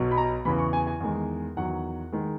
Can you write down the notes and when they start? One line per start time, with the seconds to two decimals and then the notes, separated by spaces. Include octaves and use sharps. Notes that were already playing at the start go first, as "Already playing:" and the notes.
Already playing: B1 B2 F#3
0.11 B5
0.18 A#5
0.45 E2 C#3 E3 B5
0.59 C#6
0.73 G#5
0.87 G#5
1.00 E2 D#3 G#3
1.57 E2 D#3 F#3 F#5
2.12 D#3 G#3